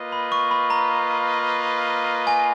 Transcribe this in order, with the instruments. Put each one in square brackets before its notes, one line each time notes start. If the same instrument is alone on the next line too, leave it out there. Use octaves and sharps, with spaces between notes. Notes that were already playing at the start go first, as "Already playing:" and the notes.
Already playing: [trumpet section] A#3 F4 B4 D#5
[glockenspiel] B5
C#6
B5
A#5
G#5